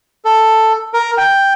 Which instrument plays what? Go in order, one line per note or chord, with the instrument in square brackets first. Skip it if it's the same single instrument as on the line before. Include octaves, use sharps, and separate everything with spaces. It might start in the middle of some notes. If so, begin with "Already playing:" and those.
[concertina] A4
A#4
G5